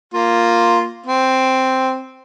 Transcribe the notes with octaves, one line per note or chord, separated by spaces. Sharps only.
A#3 F4
C4